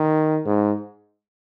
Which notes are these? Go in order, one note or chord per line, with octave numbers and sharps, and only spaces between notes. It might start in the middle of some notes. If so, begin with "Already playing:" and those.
Already playing: D#3
G#2